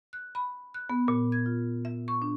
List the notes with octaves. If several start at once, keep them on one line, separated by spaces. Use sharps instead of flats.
F#6
B5
F#6
B3
A#2
G#6
F4
E5
C#6
D4